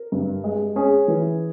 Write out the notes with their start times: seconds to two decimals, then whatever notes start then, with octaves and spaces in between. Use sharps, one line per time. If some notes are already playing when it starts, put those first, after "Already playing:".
Already playing: A#4
0.12 G2
0.44 G#3
0.76 C#4 G#4
1.08 E3